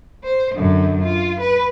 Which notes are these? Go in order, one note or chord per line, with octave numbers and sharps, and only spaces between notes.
C5
F#2 D3
F4
B4